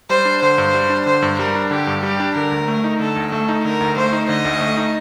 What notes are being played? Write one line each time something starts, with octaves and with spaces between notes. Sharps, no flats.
G3 C5
D4
D3 C5
G2
G3
D4
D3 C5
G2
G3 A#4
D4
D3 G4
G2
G3 G4
D4
D3 A#4
D2
A3
D#4
D3 A4
D2
A3 A4
D#4
D3 A#4
D2
A3 C5
D#4
D3 D#5
D2
A3
D#4